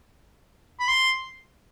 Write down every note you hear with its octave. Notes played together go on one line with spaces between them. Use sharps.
B5
C6